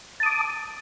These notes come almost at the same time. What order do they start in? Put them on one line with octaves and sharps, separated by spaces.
A5 D#6 D6